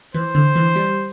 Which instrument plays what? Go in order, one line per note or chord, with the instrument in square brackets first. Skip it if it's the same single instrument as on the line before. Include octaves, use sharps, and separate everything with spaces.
[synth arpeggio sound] E3 [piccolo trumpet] C5
[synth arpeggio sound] D3
E3
G3